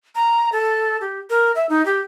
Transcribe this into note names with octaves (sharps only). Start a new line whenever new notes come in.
A#5
A4
G4
A#4
E5
D#4
G4